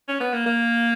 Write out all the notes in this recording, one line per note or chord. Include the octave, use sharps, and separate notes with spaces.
C#4
B3
A#3
A#3